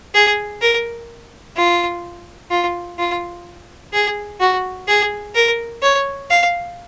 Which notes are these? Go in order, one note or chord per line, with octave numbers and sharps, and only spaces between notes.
G#4
A#4
F4
F4
F4
G#4
F#4
G#4
A#4
C#5
F5